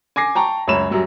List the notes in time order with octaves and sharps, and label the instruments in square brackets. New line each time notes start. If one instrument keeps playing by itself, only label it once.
[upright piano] G#5 D6 A#6 C7
G5 A5 A#5 C#6
C#2 F#2 C#5 B5 E7
F#2 F#3 G3